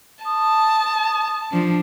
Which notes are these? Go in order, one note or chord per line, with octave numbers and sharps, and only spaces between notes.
A5 D#6
F3 D4